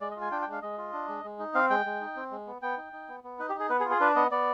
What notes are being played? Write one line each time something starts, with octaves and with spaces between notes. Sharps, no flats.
G#3 D5
D#5
F4
G#5
D4 G5
G5
G#3 F5
G#3 D#5
F4
D4
G#3
G#3
D#4
C4 F5
G#3 G5
G#3
D#4
C4
G#3
B3
B3 G5
D#4
D#4
B3
B3
D#4 B4
G4
D#4 G#4
B3 B4
G#4
F4
G#4
D4 B4
B3 D#5
B3 D5